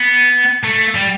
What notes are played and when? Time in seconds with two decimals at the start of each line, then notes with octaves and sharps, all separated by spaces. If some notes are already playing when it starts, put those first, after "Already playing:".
Already playing: B3
0.64 A3
0.95 G3